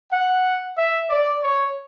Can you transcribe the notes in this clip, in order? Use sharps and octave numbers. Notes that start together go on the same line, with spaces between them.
F#5
E5
D5
C#5